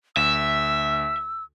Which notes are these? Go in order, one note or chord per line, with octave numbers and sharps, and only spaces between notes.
D2 E5 E6